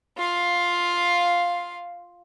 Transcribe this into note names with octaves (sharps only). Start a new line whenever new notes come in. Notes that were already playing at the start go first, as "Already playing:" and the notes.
F4 F5